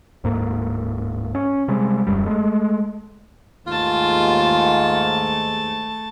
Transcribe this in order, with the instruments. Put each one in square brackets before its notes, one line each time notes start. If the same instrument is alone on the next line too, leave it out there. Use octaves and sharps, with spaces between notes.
[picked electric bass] D1 G#2 A#3
C#4
C3 G3 G#3
D#1 A#1 F#2 G3
G#3 A3
[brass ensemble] D#2 G#2 [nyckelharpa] A3 A5 [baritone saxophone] F4